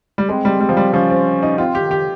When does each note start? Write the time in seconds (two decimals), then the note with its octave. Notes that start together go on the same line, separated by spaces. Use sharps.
0.18 G3
0.29 G#3 C4
0.45 G3
0.60 G3
0.69 F3
0.77 G3
0.94 F3 C#4
1.10 C4
1.43 D#4
1.58 C4 F4
1.75 G4
1.80 D#3
1.91 G4